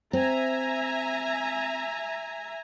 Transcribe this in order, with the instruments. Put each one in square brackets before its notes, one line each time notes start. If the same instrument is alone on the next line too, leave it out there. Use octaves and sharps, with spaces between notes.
[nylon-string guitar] C4 [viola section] E5 G#5 A#5